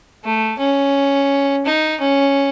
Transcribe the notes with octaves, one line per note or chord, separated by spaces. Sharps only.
A3
C#4
D#4
C#4